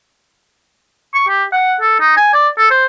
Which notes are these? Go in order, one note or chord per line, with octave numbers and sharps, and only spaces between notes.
C#6
G4
F#5
A4
D#4
G#5
D5
A4
C5